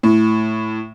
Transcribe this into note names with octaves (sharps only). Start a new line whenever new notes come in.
A2